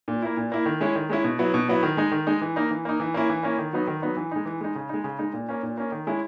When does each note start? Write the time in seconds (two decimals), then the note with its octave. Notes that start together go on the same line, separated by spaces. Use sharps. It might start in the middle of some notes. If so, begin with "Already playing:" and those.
0.08 A#2
0.22 A#3 E4
0.37 A#2
0.52 A#3 E4
0.66 D#3
0.81 G#3 C#4 E4
0.95 D#3
1.10 G#3 C#4 E4
1.24 B2
1.39 F#3 B3 E4
1.54 B2
1.68 F#3 B3 E4
1.83 D#3
1.97 G#3 D#4
2.12 D#3
2.27 G#3 D#4
2.42 E3
2.56 A#3 D#4
2.71 E3
2.85 A#3 D#4
3.00 E3
3.14 A#3 C#4 E4
3.29 E3
3.43 A#3 C#4 E4
3.58 D#3
3.73 F#3 B3 D#4
3.87 D#3
4.02 F#3 B3 D#4
4.17 E3
4.31 G#3 D#4
4.46 E3
4.61 G#3 D#4
4.75 C#3
4.89 G#3 D#4
5.04 C#3
5.19 G#3 D#4
5.33 A#2
5.49 A#3 C#4
5.63 A#2
5.77 A#3 C#4
5.92 D#3
6.07 G#3 C#4 E4